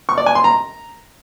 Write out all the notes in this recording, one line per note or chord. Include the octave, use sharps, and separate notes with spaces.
C#6
D5
G#5
C6
A#5